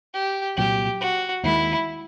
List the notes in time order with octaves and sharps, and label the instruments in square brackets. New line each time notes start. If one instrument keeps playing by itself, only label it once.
[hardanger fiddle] G4
[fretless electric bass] C2 A#2 F#3 [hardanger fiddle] G4
[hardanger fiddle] F#4
[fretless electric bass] D#2 D#3 G#3 [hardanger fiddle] E4